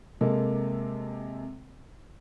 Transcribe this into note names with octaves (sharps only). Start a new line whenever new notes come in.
C3 G#3 A#3 A4